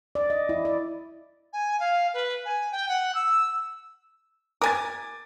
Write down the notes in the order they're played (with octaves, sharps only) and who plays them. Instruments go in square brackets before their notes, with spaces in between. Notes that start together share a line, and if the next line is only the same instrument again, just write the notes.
[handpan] D5
D#5
E4
D5
[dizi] G#5
F5
B4
G#5
G5
F#5
E6
[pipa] A#4 G#5 [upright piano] D6 A6